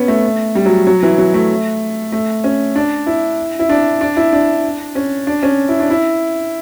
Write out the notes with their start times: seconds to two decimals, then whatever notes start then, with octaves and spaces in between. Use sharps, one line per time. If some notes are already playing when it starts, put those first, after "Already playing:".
Already playing: B3 C#4
0.08 A3
0.55 G3
0.66 F#3
0.87 F#3
1.03 E3
1.18 F#3
1.34 A3
2.12 A3
2.44 C#4
2.75 D4
3.06 E4
3.59 E4
3.69 D4
4.01 D4
4.17 E4
4.32 D4
4.95 C#4
5.27 D4
5.43 C#4
5.68 E4
5.80 D4
5.90 E4